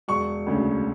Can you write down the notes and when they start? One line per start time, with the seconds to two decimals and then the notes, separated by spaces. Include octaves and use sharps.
0.08 E1 C#6
0.46 D2 C#3